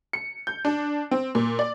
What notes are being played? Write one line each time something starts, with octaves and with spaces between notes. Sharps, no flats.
C#7
G6
D4
C4
A#2
D5